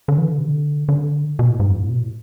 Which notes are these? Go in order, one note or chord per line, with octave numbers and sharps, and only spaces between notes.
D3
E3
D3
C3
D3
D3
B2
A2
G#2
F2
A2
B2
A2